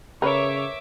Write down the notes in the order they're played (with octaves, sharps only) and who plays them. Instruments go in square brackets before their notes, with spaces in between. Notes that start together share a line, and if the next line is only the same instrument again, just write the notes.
[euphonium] C#3 [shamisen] A#4 B4 [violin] C#5 [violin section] E5 D6